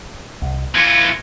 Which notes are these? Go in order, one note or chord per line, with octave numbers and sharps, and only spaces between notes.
C2
E3 F4 G#6 A#6 C#7